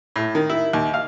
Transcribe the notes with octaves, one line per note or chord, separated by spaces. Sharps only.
A2
D#3
E4
D#2
F5